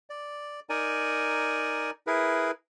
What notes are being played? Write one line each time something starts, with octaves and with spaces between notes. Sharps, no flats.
D5
D#4 A#4 D5 G#5
E4 G#4 A#4 B4